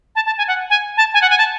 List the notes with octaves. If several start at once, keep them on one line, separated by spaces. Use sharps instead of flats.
A5
A5
G#5
F#5
G#5
A5
G#5
F#5
G#5
A5